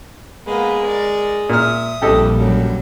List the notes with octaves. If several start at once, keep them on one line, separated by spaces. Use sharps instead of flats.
G#3 A#3 B3
A#4 D5
A#2 E5 D#6 F6
A#1 F2 G3 G4 A4 D#5
F#2 F#3